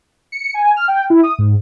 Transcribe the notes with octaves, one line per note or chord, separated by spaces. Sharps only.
C#7
G#5
F6
G5
E4
D#6
G#2